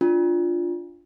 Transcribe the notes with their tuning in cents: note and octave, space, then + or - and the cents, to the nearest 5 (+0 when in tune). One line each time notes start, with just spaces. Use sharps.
D4 +0 F4 +0